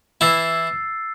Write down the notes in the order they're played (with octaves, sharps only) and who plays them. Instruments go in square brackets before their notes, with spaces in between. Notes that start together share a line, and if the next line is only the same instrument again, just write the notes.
[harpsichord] E3 E4 [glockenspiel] E6 A6 C7